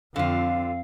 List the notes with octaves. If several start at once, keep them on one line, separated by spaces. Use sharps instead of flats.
F2 D3 C4 F4 F5